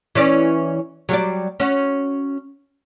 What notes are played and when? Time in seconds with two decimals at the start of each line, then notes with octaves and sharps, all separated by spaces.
0.15 E3 C#4 D5
1.09 F#3 G3 D5
1.60 C#4 F#4